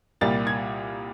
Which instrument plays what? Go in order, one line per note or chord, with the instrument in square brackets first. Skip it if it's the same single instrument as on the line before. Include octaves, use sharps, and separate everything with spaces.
[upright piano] C2 A#2 G3 A#3 A6
G#6